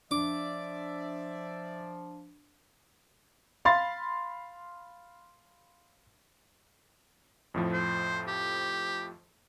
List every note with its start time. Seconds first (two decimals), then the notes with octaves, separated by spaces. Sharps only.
0.11 F3 D4 D5 E5 D6
3.65 F5 B5 C6 A6
7.54 F2 A2 F3
7.73 C5
8.27 G4